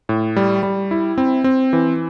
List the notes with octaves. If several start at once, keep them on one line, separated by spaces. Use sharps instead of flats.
A2
G3
G3
E4
C4
C4
E3